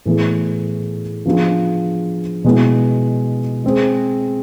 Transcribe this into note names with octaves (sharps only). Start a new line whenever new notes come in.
A2 E3 B3 E4 G#4
F3 B3 D4 F4 G#4
B2 G#3 B3 E4 G#4
G#3 C4 G#4